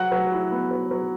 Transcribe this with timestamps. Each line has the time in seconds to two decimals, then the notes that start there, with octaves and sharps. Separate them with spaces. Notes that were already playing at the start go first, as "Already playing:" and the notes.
Already playing: F#3 F#5 F#6
0.12 F#3
0.32 E4
0.51 B3
0.71 F#3
0.91 F#3